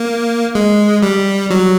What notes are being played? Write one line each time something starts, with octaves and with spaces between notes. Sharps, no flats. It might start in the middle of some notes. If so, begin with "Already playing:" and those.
Already playing: A#3
G#3
G3
F#3